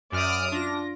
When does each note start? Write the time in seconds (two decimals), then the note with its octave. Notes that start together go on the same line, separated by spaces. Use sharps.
0.12 F#2 D5 E5 D#6 F6 D7
0.52 D4 F4 A#6